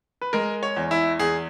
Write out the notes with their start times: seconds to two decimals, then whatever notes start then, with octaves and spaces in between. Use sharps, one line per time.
0.22 B4
0.33 G#3 A#4
0.63 C#5
0.77 E2
0.91 E4
1.19 E2 G#4